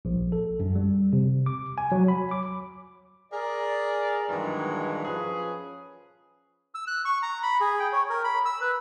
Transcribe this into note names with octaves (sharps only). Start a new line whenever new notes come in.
A#1
A4
F#2
G3
C3
D6
G#5
F#3
B5
D6
G#4 A#4 D5
G2 A#2 D#3 E3 F#3 G#3
F3 C#4 F4 G#4 B4
E6
F#6
C#6
A#5
B5
G#4
G5
C#5
A#4
B5
E6
B4